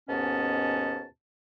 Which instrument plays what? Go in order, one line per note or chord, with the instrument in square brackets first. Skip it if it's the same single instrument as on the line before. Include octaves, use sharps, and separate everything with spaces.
[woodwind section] D#2 G#2 B2 B3 C#4 A5